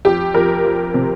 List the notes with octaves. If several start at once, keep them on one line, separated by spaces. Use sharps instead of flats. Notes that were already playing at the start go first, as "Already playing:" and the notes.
F2 G4
F2 A#4
F3
C3